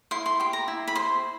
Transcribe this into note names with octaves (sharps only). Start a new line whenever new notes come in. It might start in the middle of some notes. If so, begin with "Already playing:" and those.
E4 C6
C6
G4 C6
A#5
E4
B5
C5 C6